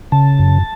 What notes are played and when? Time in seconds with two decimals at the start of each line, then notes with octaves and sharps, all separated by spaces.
0.12 C#3 A5
0.39 F#2